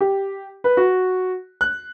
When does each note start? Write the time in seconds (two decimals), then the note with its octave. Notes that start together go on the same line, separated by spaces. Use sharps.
0.01 G4
0.64 B4
0.77 F#4
1.61 F#6